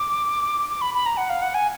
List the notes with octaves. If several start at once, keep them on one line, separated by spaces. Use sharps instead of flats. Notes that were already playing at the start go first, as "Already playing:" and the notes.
Already playing: D6
D6
B5
B5
A#5
F#5
F5
F#5
G#5